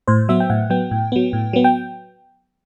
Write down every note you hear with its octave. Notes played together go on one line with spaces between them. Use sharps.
A2 C5
F#3 B3 E5
G5
A2 F#5
F#3 B3 G5
A2
F#3 B3
A2
F#3 B3
G5